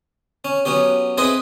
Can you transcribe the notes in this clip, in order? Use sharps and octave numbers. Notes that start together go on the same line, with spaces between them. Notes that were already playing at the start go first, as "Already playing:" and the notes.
C#4
F#3 B3 C#4 G4
C4 D#4 E4 G#4 B4 D#5